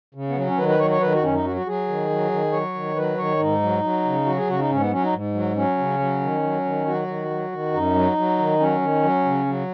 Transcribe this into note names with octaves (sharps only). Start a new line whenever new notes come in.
C#3
B3
F#3 C#4
C#4
D#3 B4
B4
F#3 C#5
C#5
D#3 B4
F#4
F#2 C#4
D#4
F#3 F#4
F#4
F#3 G#4
D#3
F#3
D#3
F#3 C#5
D#3
F#3 B4
D#3 C#5
G#2 D#4
F#3
F#3
C#3
F#3 F#4
G#4
C#3 F#4
D#4
G#2 C#4
B3
F#3 C#4
D#4
G#2
F#3
F#3 C#4
C#3
F#3
D#3
F#3
D#3
F#3 F#4
D#3
F#3
D#3
F#2 D#4
F#3
F#3
D#3
F#3 C#4
D#3
F#3
C#3
F#3